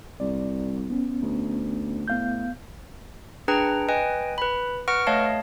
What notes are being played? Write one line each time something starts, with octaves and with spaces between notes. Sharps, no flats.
C2 D5
B3 C#4
D2
A2 B3 F5 G6
D4 G#4 B4 G5 A#5
B4 D#5 G5 G#5
B4 B5
B4 F#5 C#6 F6 A#6 D7
A3 C#5 D#5 F5 A5